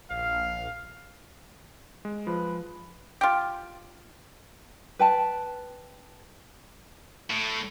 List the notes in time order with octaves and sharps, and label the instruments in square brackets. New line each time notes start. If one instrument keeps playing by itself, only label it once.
[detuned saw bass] A#1 [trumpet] F5
[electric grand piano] G#3
[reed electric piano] F3 [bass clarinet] B4
[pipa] F4 G4
[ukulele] B4 G5 A5
[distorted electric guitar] A2